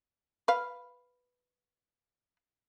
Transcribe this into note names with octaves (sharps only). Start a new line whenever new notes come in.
B4 F5